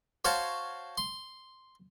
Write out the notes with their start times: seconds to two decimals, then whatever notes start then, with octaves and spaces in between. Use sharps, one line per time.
0.25 F#4 C5 C#5 F5 A5
0.98 C6